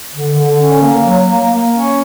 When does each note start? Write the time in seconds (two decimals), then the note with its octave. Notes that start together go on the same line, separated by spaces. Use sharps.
0.15 D3
0.37 D3
0.59 C#4
0.82 A#3
1.04 F#3
1.27 A#3
1.49 A#3
1.72 C#4